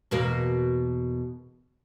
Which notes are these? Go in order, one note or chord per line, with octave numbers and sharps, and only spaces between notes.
E2 B2 A#3